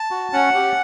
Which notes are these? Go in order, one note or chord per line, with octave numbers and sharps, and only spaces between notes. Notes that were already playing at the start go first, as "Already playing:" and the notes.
Already playing: A5
F#4
C#4 F#5
G4